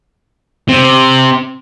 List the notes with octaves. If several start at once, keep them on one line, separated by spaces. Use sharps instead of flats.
C3